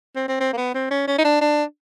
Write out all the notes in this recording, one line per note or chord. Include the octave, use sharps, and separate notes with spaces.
C4
C4
C4
A#3
B3
C4
C#4
C#4
D#4
D4
D4